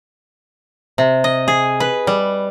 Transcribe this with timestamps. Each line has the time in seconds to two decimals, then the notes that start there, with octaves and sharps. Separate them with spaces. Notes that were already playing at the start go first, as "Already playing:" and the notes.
0.98 C3
1.24 D#5
1.48 G#4
1.80 B4
2.07 G3